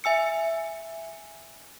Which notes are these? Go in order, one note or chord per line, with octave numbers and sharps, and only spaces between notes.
E5 G#5 E6 C#7